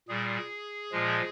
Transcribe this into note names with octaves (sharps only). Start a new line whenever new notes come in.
A#2 G3 G#4
A#2 F3 G#3